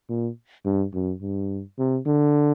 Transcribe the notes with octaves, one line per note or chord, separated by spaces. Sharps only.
A#2
G2
F#2
G2
C3
D3